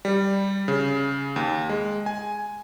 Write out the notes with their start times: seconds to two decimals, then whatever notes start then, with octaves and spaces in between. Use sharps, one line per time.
0.05 G3
0.68 C#3
1.36 D#2
1.69 G#3
2.06 G#5